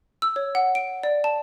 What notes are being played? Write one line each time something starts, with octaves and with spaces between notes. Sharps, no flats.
E6
C#5
F#5
D7
D5
A5